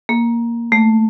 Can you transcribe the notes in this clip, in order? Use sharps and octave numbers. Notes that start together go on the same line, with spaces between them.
A#3
A3